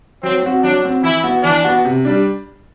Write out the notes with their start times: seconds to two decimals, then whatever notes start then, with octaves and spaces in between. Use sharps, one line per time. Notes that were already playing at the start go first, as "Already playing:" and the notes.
0.23 F#3 C4
0.42 C4 F#4
0.63 F#3 D4
0.83 C4 F#4
1.03 E3 E4
1.23 B3 F#4
1.43 E3 D4
1.64 B3 F#4
1.85 C3
2.05 G3 D4